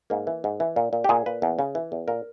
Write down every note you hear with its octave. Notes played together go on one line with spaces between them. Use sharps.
G#2 A#3
E3
G#2
E3
A#2
A#2
G4
A#2 G#4
A#2 B4
E2
C#3
E3
E2
A#2 A#4